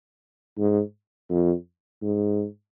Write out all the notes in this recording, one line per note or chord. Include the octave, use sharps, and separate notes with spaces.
G#2
F2
G#2